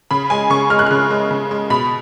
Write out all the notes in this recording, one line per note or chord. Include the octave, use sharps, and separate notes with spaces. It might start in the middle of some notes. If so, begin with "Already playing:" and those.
C#3 B5
G#3 G#5
C#3 C#6
G#3 F6
F#6
C#3 F6
G#3
C#3
G#3
B2 B5